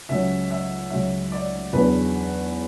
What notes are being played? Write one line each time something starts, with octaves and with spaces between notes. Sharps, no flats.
C#2 C#3 F#3 C#4 E5
E5
C#2 C#3 F#3 C#4 E5
D5
E2 C#3 F#3 B3 D4 B4